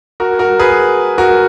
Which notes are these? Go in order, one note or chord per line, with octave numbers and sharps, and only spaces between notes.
F#4 A#4
F#4 A#4
G#4 B4
F#4 A#4